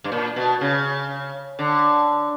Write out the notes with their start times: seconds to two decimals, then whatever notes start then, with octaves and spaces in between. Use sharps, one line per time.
0.04 G2
0.12 A#2
0.36 B2
0.61 C#3
1.59 D3